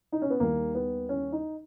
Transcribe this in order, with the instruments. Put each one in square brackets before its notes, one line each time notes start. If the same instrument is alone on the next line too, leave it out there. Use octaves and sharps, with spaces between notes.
[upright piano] D#4
C#4
B3
D#2 D#3 G3 A#3
B3
C#4
D#4